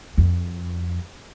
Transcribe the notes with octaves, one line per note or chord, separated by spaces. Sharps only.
F2